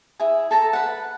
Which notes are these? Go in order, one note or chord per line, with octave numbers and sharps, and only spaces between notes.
E4 G#4
A4 A5 A#5
B4 F#5